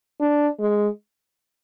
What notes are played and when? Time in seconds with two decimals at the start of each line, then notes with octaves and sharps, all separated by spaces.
0.20 D4
0.60 G#3